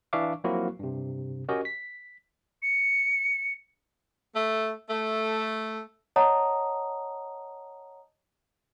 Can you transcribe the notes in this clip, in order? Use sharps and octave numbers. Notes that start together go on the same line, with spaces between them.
E3 D4 E5 F5 C#6 D6
F3 F#3 A#3 C4 E4 F#4
G2 C3
C#4 F#4 G4 A#4 D#5
B6
C#7
A3
A3
C#5 D#5 F#5 A5 A#5 D#6